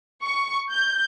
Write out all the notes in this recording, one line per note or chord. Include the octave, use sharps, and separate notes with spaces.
C#6
G6